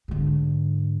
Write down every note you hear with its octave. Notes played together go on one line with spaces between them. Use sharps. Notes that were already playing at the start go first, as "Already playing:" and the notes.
G#2 D3